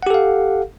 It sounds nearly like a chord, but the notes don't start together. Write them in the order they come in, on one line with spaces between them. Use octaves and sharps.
F#5 G4 A4 F5